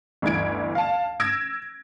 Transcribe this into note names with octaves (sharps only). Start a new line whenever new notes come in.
G1 D2 E3 G#6 D7
F5 A5
E6 G#6 A#6 D7